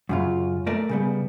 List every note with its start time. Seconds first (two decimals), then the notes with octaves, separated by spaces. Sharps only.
0.09 F#2 C#3 F4
0.67 A3 A#4 D5
0.89 C#3 G3 B3